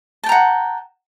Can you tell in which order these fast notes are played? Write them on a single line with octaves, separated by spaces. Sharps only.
A5 G5 A#5 F#5